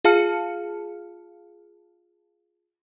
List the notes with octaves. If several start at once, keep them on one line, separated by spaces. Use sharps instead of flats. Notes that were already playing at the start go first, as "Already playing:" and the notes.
F4 G#4 F5 A5 F6 C#7